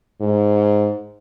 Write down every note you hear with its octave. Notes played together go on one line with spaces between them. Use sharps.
G#2